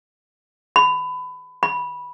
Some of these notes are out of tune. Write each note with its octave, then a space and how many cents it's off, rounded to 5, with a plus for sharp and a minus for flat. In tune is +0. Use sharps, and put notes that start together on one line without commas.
B5 +25
B5 -10